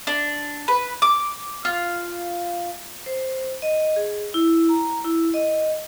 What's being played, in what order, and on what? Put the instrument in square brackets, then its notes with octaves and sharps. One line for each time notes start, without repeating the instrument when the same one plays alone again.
[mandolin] D4
B4
D6
F4
[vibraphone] C5
D#5
G#4
E4
A#5
E4
D#5